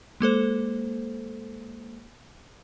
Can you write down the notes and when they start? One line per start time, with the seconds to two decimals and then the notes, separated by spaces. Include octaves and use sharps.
0.20 G#3 A#3 A4 C5